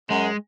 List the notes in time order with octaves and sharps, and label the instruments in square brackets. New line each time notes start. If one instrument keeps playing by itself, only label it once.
[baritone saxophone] F#2 [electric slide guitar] G#3